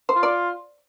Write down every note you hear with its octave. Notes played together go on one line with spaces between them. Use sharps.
C5
F4
D5